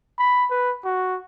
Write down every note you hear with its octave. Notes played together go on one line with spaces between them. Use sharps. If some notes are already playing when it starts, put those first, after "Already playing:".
B5
B4
F#4